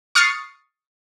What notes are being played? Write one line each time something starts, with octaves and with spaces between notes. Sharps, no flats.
C#6 D#6 F6 A6 C7 C#7